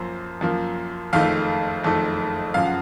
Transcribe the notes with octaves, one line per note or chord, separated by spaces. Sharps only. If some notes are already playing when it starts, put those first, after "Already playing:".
Already playing: F#2 F3 A#3 C5
F#2 F3 A#3
F#1 F2 D#3 A3 F5
F#1 F2 D#3 A3
F#2 C#3 F3 F5
F#5